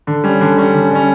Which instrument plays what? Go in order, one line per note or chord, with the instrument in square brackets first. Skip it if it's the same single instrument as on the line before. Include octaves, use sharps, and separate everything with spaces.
[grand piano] D3
G3 C#4
D3
G3 C#4
D3
G3 C#4